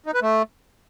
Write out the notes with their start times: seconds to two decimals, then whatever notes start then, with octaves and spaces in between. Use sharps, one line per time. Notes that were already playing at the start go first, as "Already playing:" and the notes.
0.06 D#4
0.14 B4
0.22 A3